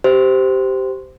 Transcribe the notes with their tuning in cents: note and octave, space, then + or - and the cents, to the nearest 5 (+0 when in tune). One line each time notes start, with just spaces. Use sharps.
G4 -10 C5 -15